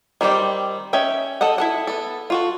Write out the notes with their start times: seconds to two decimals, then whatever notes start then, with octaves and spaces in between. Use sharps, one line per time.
0.21 D#3 G3 C4 G4 D5
0.93 C#4 D#5 E5 G5
1.41 F#4 A4 D#5 F#5
1.58 E4 A4 F#5
1.87 B3 A4
2.30 F4 F#4 A4